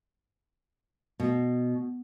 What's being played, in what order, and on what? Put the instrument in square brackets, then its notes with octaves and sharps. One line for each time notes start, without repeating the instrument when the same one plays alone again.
[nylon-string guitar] B2